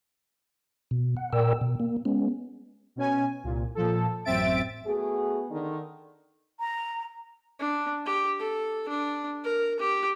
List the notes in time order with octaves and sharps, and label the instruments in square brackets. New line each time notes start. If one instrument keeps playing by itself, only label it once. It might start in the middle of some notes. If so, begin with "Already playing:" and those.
[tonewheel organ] B2
F#5
A#2 A#4 D5 G5 E6
B2
A#3
G#3 B3 C#4
[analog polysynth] B2 C#4 G#5
C2 A#2
A#2 F3 A4
A1 F#2 C4 E5 A6 D7
[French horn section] A3 B3 F#4 G#4
D3 D#3
[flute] A#5
[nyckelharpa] D4
G4
A4
D4
A#4
G4